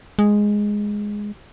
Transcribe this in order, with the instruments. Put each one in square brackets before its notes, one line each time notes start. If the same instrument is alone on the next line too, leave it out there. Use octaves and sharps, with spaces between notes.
[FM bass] G#3